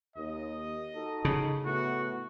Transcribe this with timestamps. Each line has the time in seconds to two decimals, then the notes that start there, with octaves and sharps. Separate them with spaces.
0.16 D#2 D#5
0.94 D#4 F#4 A4
1.25 C#3
1.65 A2 A3 B3 F#4